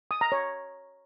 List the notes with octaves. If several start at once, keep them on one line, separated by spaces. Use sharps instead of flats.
D#6
A#5
C#5